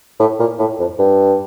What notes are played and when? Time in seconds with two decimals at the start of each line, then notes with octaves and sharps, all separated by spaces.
0.19 A2
0.39 A#2
0.59 A2
0.79 F2
0.99 G2